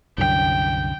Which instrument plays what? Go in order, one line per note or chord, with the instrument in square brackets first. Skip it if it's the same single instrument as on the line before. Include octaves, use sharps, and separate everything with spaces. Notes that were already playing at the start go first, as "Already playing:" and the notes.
[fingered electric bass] C2 F#2 D3 [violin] G5